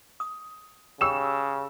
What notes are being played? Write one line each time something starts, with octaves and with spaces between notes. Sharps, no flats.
D#6
C#3 G4 C#5 G5 E6 E7